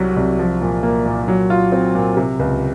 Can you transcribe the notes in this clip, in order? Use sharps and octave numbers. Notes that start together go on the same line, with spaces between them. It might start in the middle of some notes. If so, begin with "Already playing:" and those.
Already playing: C2 C3 F#3
C2
F3
A#2
A#3
A#2
F#3
F4
C4
A#2
C3
C#2